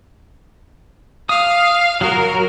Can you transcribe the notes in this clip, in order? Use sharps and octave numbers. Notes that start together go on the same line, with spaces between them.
F5 D#6
F#3 F#4 A#4